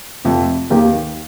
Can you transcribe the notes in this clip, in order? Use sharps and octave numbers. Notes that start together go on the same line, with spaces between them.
F1 F2 C3
D#2 D#3 A#3 G4